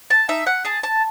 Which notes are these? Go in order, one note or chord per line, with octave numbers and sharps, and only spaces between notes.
A5
D#4 E5
F#5
G#4 A5
A5